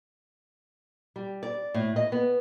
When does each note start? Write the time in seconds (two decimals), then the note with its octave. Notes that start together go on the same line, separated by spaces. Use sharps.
1.16 G3
1.43 D5
1.74 A2
1.96 D#5
2.12 B3